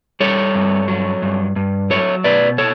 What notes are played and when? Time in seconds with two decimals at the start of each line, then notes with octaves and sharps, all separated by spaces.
0.20 G3 A4 C#5
0.55 G2
0.88 F#3
1.22 G2
1.56 G2
1.90 F#3 A4 C#5
2.24 B2 B4 D5
2.58 A4 C#5